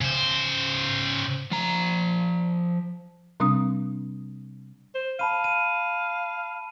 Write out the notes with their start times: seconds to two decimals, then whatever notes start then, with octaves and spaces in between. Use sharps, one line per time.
0.01 C#3 C5
1.52 F3 A#5
3.40 C3 G3 C4 D4 D#6
4.95 C5
5.19 F5 A5 B5 D#7
5.44 D#7